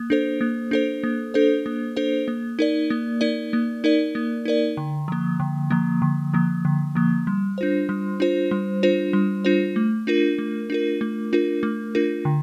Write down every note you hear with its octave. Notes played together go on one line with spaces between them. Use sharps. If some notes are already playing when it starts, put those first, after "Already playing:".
Already playing: A#3
D4 A4 C5
A#3
D4 A4 C5
A#3
D4 A4 C5
A#3
D4 A4 C5
A#3
D#4 A#4 D5
A#3
D#4 A#4 D5
A#3
D#4 A#4 D5
A#3
D#4 A#4 D5
D3
F3 A#3
D3
F3 A#3
D3
F3 A#3
D3
F3 A#3
G3
D4 F4 C5
G3
D4 F4 C5
G3
D4 F4 C5
G3
D4 F4 C5
A3
D4 F4 A#4
A3
D4 F4 A#4
A3
D4 F4 A#4
A3
D4 F4 A#4
D3